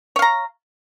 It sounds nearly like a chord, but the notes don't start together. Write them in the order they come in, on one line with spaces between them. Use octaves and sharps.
C#5 F5 A#5